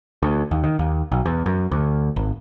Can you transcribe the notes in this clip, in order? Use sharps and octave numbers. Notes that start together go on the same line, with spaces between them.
D2
D#2
D#3
D#2
B1
E2
F#2
D2
G#1